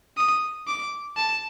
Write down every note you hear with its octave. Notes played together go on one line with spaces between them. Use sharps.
D#6
D6
A5